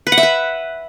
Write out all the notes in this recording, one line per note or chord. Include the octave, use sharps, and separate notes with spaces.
B4
F#5
E5
B4